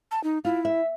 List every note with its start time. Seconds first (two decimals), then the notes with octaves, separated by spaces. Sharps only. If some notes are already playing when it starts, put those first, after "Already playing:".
0.11 A5
0.24 D#4
0.45 E4 F4
0.65 E5